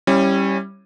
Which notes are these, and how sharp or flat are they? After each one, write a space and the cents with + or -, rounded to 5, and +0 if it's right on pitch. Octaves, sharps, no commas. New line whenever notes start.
G3 +0 C#4 -20 E4 +0